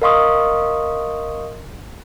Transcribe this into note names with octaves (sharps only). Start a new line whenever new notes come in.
A#4 D#5 F5 C6 C#6 D#6